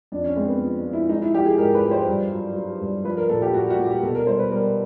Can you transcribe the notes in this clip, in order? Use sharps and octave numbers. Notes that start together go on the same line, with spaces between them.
F2 D4
C#4
G#3 C4
B3
F3
F3
E4
G#3 D#4
E4
F3 G4
G#4
G#2 A#4
B4
F3
C5
G2
F#3
F#3
G2
F3 B4
A#4
A#2 A4
G4
A#2 F#4
F#4
A#2
G4
B2 A4
A#4
G3 C5
B4
G3 A#4